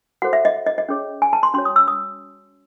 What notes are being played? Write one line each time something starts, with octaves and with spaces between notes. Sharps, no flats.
F#4 A4 C5 F#5
E5
D#5
D#5
D#5
C#4 G#4 C#5
G#5
A5
C6
C#4 F#4 C#5 C6
D#6
E6
D#6